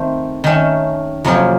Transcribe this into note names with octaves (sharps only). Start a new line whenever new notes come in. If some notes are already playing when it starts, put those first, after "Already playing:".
Already playing: D#3 A3 C4
D#3 A3 C#4
F2 C3 F#3 A#3 C#4